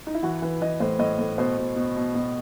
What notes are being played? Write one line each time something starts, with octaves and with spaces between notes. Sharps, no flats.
D#4
E4
E3 F#4
E3 B4
E3 D#5
A2 C5
A2 D#5
A2
B2 C5
B2
B2
B2
B2